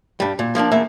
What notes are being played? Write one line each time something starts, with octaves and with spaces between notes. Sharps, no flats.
G2 G3
A#2
F3 A#3 C4 D4
E2 A#3 E5